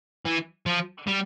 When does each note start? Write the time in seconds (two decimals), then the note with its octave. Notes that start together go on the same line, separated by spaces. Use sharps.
0.26 E3
0.66 F3
1.07 G3